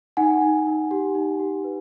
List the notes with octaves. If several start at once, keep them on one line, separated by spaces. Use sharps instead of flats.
D#4 F#5 G#5
D#4
D#4
G4
D#4
G4
B4